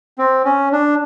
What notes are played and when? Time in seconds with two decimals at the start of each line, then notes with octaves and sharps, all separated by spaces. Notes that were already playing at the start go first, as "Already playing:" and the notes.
0.18 C4
0.45 C#4
0.72 D4